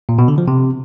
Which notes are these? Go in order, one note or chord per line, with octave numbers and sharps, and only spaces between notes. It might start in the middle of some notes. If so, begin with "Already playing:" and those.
A#2
B2
D3
F3
C3